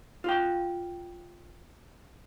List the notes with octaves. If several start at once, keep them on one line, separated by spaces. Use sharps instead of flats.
F4 G5